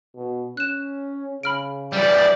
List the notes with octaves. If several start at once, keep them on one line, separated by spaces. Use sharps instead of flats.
B2
C#4 F#6 E7
C#3 B5 F6 D7
E3 G3 D5